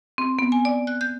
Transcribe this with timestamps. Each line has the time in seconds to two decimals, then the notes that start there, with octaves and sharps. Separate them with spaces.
0.18 C4
0.39 B3
0.52 G#5
0.65 D5
0.87 F#6
1.01 G6